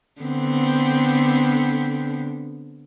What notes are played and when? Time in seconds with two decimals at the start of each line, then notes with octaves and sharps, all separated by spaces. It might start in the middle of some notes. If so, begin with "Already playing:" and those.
0.21 D3 B3 C4